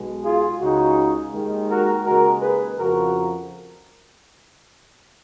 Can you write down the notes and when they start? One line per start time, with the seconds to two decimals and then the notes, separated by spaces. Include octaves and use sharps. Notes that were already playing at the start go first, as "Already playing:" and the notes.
Already playing: B1 B2 G#3
0.24 F4 G#4
0.61 C#2 C#3 G#3 D#4 F#4
1.33 D#2 D#3 G#3
1.70 F#4 A#4
2.05 D#2 C#3 G#3 F#4 A#4
2.41 G#4 B4
2.78 F2 C#3 F3 F#4 A#4